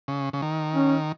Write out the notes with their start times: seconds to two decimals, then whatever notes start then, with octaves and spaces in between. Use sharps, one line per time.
0.08 C#3
0.33 C#3
0.42 D#3
0.75 C#4